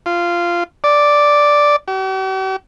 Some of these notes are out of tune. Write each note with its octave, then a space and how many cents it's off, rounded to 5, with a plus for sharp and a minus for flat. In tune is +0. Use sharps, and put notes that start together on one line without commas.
F4 -10
D5 +0
G4 -45